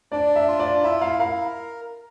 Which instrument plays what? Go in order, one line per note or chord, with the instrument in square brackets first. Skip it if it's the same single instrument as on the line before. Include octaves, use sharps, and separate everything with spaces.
[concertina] D4 [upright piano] D5
[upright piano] E5
[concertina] F4
[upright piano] D5
[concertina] E4 [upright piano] E5
[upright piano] F5
[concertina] A#4 [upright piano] F5